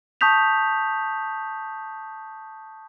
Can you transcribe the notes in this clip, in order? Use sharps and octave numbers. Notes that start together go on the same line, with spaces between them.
A5 C#6 D#6 G6 B6 F7